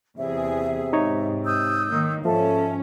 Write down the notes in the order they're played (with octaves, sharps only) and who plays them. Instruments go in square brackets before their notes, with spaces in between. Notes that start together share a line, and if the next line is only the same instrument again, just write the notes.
[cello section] E2 G#4 [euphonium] C3 [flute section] E5
[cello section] G#2 [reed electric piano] D#4 C#5
[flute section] D#6 E6 G6
[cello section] D#3 A#3
[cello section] G#2 C#4 [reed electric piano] F3 [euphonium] A4 [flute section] E5 A5